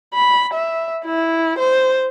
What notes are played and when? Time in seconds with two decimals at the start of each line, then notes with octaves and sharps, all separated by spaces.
0.14 B5
0.54 E5
1.05 E4
1.59 C5